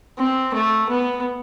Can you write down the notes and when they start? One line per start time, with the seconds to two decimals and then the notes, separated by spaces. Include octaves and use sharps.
0.18 C4
0.53 A3
0.89 B3